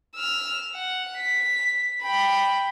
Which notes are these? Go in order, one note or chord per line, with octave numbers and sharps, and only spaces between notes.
E6 F6
F#5
B6
G5 B5